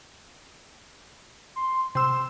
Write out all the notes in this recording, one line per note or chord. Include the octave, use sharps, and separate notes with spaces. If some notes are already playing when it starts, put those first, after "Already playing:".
C6
C3 C6 E6 E7